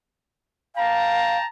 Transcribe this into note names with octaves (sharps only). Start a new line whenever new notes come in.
F5 G5 A5 A#5